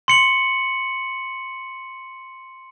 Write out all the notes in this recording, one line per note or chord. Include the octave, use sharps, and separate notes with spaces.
C6 C#7 F#7